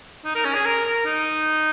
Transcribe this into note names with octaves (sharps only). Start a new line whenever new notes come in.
D#4
A#4
C#4
G#4
A#4
A#4
D#4